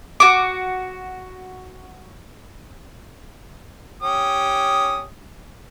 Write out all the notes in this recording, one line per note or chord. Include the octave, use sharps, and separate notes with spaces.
F#4 D6
C#4 G4 D#6